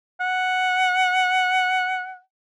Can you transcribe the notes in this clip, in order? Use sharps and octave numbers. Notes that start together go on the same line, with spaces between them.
F#5